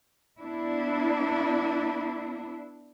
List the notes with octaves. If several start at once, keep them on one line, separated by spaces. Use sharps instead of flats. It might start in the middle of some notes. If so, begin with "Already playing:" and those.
B3 D4 E4